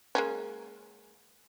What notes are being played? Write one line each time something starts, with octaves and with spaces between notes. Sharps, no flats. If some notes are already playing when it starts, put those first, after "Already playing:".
G#3 A#3 C#4